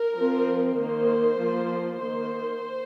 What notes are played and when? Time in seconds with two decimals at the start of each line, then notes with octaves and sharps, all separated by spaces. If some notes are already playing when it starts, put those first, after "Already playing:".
Already playing: A#4
0.17 F3 C4
0.77 D#3 A#3 C5
1.38 F3 A#3
2.00 D#3 A#3 C5